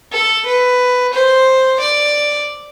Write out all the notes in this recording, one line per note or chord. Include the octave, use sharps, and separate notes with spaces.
A4
B4
C5
D5